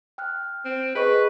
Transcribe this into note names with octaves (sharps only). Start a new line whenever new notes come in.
G5 F6 F#6
C4
G#4 B4 D#5 C#6